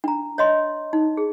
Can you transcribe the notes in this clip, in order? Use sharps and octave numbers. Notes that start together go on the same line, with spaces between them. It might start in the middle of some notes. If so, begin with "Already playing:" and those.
D4 A#5
C#5 D#5 C6
D#4
G#4